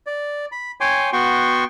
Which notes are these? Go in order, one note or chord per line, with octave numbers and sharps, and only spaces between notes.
D5
B5
C#5 G5 G#5 C6 D6
B3 F#4 G5 C6 C#6